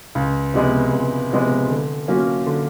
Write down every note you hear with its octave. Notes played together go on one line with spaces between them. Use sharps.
C#2
C3 F3 G#3 B3
C#2
C3 F3 G#3 B3
D3
F#3 A#3 C#4 F4
D3